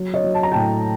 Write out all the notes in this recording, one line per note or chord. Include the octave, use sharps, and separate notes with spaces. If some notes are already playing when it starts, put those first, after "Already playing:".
Already playing: F#3
C#5 D#5
F#3
A5
A#5
A2 G5 A5